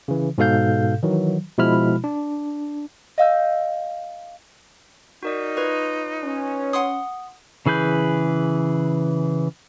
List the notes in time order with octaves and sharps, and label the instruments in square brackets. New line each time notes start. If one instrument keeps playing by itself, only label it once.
[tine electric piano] C#3 E3
G#2 B2 A4 F5 G6
D#3 E3 F#3
B2 F3 G#3 E4 B5 F6
D4
[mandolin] D#5 F5 E6 G6
[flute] D#4 [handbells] F#4 A#4 D5
[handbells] F4 B4 [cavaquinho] C#5
[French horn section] C#4
[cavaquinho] F#5 C6 D#6
[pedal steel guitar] C#3 E3 G#4 B4 G6